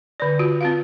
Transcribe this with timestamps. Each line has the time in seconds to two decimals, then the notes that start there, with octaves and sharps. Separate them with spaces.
0.20 D3 D5
0.39 F4 F#4
0.61 C4 F4 F5